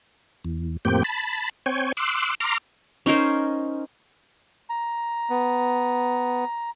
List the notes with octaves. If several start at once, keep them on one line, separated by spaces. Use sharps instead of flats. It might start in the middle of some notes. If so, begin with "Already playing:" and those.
E2
F2 A2 A#3 C4 G4 G5
A5 B5
C4 C#5 G5 G#5
C6 D6 E6 F#6
A#5 C6 D6 F6
C#4 D#4 A#4 C5
A#5
B3